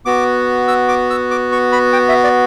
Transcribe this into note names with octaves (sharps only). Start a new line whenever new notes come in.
B3 F#4 D6
E6
D6
E6
D6
C#6
B5
G5
E5
D5